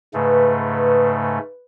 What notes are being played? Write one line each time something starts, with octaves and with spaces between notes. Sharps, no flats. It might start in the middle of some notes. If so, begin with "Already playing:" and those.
G#2 C#3 A3 B4